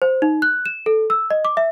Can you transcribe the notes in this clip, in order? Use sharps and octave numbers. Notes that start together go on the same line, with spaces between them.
C5
D#4
F#6
E7
A4
E6
D#5
D6
E5